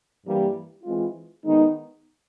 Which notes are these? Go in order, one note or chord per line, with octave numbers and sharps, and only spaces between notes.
G2 E3 G3 A#3
E3 G#3 C4 F4
D#3 G#3 B3 D#4